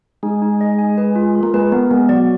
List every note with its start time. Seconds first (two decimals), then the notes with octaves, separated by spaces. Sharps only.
0.23 G#3 D#4
0.42 D#4
0.61 D#5
0.79 G#5
0.98 B4
1.16 F4
1.35 F4
1.43 A#3
1.54 G#3 B4
1.72 A#3 B3
1.91 G#3 B3
2.09 F#3 D5